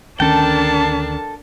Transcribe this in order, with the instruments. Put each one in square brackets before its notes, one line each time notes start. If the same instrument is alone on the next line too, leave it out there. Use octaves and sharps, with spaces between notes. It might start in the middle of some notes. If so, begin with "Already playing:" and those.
[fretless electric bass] D2 D#3 C#4 [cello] D4 [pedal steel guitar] A4 G5 [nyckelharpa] A#4 A5